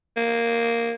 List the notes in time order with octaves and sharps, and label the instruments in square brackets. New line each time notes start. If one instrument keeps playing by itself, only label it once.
[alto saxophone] A#3